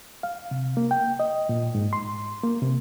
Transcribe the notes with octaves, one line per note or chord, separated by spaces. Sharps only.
F5
C3
A#3
G5
D#5
A#2
G#2
C6
A#3
C3